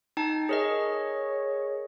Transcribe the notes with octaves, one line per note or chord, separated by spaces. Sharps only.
D#4 G5 A5
G#4 A#4 C#5 D#5